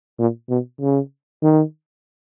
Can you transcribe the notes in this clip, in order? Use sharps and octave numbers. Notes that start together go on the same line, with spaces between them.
A#2
B2
C#3
D#3